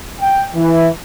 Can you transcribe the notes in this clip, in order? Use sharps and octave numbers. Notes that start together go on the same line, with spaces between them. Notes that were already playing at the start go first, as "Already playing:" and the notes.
G5
E3